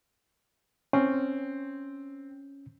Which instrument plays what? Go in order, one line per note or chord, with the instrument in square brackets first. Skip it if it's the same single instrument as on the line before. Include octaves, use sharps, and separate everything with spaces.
[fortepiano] C4 [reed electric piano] C#4